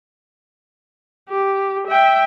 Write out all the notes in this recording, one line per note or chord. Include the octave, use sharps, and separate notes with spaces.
G4
E5 G5